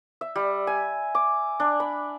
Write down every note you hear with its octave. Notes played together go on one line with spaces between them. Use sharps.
E5
G3
G#5
D6
D4
B5